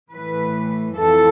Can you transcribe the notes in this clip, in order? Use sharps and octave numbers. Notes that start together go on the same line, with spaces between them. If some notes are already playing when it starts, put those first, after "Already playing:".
A2 E3 B4
F2 E3 A4